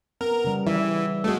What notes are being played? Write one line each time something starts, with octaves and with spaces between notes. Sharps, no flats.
B3 A#4
C#3 G3
E3 E5
G#3 A3 B3 F#4 A4